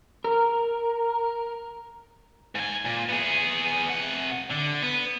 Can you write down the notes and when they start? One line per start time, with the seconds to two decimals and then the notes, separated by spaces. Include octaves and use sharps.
0.24 A#4
2.55 G#2 G#5
2.86 A#2
3.09 B3 G#4
3.90 C3 F#5
4.51 D3
4.83 B3